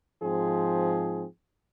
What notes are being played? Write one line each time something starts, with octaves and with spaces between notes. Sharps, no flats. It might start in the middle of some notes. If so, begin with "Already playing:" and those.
G#2 F3 C4 G#4